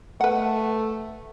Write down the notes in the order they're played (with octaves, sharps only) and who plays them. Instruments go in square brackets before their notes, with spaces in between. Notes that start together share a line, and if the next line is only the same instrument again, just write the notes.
[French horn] A3 [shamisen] B4 F#5